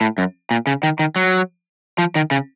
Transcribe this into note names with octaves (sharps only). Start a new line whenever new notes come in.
A2
F#2
A#2
C#3
D#3
D#3
F#3
F3
D#3
C#3